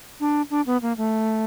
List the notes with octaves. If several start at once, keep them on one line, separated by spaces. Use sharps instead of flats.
D4
D4
B3
A#3
A3